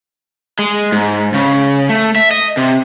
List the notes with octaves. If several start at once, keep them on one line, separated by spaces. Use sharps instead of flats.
G#3
G#2
C#3
A3
E5
D#5
C3